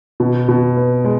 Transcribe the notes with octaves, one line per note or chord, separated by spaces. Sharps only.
B2
B2
B3
G#3